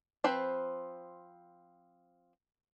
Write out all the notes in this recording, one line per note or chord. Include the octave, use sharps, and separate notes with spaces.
F3 C4 B4 C5